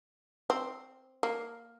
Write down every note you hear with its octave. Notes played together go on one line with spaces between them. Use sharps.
C4
A#3